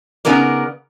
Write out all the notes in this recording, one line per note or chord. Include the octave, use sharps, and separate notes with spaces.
C#3 B3 D#4 A#4 D5